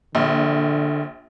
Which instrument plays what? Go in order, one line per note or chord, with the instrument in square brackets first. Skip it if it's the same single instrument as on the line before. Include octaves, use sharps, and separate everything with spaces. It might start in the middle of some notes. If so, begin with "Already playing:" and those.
[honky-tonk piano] A#1 [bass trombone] D3